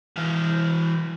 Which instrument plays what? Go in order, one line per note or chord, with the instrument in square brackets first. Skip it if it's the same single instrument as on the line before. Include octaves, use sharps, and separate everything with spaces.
[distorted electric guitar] E3 F5